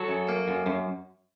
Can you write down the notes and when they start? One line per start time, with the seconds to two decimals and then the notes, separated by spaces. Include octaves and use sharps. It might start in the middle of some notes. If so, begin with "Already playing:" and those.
Already playing: F#3 F#4 A4
0.08 F#2
0.28 A#3
0.48 F#2
0.66 F#2